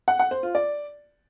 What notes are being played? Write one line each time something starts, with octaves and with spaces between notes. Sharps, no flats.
F#5
F#5
C5
F4
D5